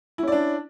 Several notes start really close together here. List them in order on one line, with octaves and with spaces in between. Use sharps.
E4 C#4 D5 D4